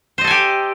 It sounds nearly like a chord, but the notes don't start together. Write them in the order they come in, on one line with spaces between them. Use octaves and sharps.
C5 D#5 A4 G#5 G4